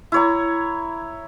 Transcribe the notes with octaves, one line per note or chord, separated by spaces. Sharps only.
E4 C#5 A#5